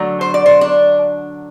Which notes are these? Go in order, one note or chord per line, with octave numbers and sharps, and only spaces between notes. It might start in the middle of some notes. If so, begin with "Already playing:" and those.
Already playing: D3 F#3 A3
C5
D5
C5
D4